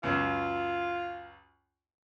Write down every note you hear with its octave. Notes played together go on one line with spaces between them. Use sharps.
C#2 F#2 F4